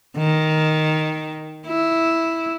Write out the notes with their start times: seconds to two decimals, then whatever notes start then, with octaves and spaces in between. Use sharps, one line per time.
0.17 D#3
1.67 E4